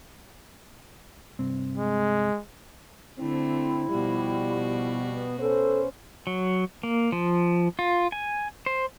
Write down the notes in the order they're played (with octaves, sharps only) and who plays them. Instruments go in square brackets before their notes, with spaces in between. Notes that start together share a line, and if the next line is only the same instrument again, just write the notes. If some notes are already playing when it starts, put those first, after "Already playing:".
[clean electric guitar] G2 C3 C4
[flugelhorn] G#3
[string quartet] D3 A3 [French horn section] C4 [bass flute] E4
[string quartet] B2 F#4 [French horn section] F3 G3
[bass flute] B3
[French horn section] C#4 B4 C5 [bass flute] A4
[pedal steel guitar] F#3
A#3
F3
F4
G#5
C5